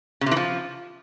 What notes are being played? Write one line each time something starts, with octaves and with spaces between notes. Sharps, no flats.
C#3
C3
E3
F3